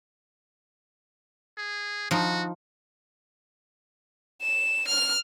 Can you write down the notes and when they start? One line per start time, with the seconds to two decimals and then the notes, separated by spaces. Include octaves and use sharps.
1.58 G#4
2.11 F3 D#4 F#4
4.43 E7
4.87 F6